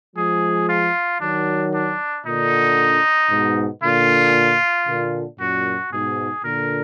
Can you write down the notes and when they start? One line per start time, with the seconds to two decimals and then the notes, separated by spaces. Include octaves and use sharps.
0.16 F3 G#3 G#4
0.69 F4
1.21 D#3 F#3 D4
1.74 D4
2.26 A#2 D3 D#4
3.30 G#2 B2
3.83 A#2 D3 F4
4.87 A#2 D3
5.40 F#2 A#2 F#4
5.92 G#2 B2 G#4
6.44 A#2 D3 A#4